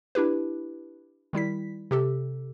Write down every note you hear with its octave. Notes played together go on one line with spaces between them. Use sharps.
D4 E4 G4 B4
D#3 G3 E4 B6
C3 G4 A4